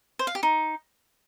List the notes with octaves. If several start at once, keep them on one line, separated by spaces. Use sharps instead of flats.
C5
F5
G4
D#4